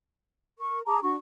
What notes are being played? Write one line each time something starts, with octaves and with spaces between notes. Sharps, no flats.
A#4 C#6
G#4 A5 A#5 D6
D4 F#4 C#6